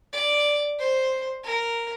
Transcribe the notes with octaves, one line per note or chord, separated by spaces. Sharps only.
D5
C5
A#4